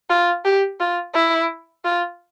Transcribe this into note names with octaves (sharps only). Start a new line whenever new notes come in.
F4
G4
F4
E4
F4